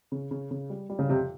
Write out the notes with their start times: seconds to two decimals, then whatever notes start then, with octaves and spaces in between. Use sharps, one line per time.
0.12 C#3
0.31 C#3
0.51 C#3
0.70 G3
0.90 G3
0.99 C#3
1.09 F2 C3